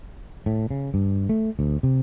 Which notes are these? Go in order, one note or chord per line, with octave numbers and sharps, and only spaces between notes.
A2
C#3
G2
A3
D2
C3